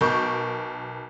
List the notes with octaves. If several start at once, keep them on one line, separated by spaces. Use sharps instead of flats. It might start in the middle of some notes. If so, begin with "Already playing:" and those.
B1 A#4 C#6 G6